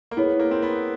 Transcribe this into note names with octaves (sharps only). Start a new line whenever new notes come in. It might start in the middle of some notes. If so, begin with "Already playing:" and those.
A#3
B3 E4 G#4 C#5
A#3
C4
B3